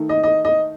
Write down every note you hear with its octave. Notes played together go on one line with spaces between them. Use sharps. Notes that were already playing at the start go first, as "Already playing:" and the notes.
Already playing: D#3 A3 D#4
D#5
D#5
D#5